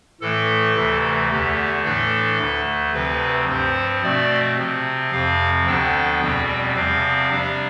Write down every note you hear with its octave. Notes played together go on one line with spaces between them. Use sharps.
A2 E3 A3 A4
D2 C3 E3 A3
E2 D3 A3 G4
A2 E3 A3 D4 A4
D2 D3 A3
D2 C3 F3 C4 B4
G2 F3 C4 C5
B2 A3 C4 D5
C3 F3 C4
F2 C3 F3 C4 F5
D2 D3 F3 B3 D4 G5
E2 B2 G3 C4
E2 C3 F3 C4 F5
C3 G3 D4